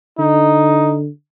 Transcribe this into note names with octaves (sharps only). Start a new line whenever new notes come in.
D3 D#4